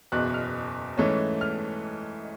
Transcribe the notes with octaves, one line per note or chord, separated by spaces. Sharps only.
F#1 E2 B2 F#6
F6
G#2 E3 A3 C#4
F6